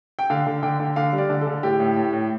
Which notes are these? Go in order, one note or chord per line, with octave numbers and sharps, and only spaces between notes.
G5
D3 F5
D3
D3 G5
D3
D3 F5
G3
D5
D3
A4
D3
A2 G4
A2
A2
A2